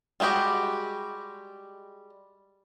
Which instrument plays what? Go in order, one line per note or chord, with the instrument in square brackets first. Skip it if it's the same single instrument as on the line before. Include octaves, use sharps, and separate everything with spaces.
[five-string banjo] G3 G#3 F#4 G4 D#5